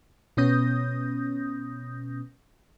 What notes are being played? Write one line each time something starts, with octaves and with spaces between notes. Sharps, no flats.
B2 B3 C#4 D#6 G6 A#6